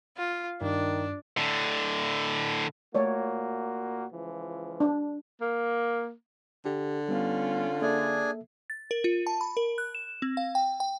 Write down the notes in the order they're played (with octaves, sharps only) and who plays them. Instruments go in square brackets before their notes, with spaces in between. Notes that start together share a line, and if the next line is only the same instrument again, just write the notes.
[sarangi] F4
[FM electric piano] G2 [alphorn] D#3 [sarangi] D4
[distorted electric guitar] A2 D3
[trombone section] A#2 A#3 F#4 [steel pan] A3 C#5 D5
[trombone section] C#2 E3 F3
[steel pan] D4
[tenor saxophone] A#3
[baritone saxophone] D3 [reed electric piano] G4
[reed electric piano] G3 B3 [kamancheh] C#4 F4
[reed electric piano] A#3 A4 E5 [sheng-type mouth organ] D4 G#4 G#5
[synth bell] A6
A#4
F4
A5
B5
A#4
F#6
E7
C4
F5
G5
G5